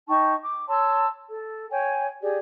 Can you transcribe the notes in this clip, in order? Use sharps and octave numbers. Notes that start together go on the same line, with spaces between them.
D#4 G5 A5 C#6
D6
C#5 A5 C6 E6
A4
C#5 G5 G#5
G4 G#4 D5